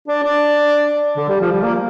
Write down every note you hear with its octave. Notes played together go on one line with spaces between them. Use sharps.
D4
D4
D3
G3
F3
G3
A#3